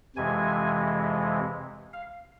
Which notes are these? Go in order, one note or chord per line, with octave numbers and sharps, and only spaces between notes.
F2 C3 E3 G#3 G#5
F5